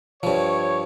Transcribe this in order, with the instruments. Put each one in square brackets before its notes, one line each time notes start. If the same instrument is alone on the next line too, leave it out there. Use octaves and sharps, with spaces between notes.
[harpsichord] G2 F3 [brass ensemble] C#5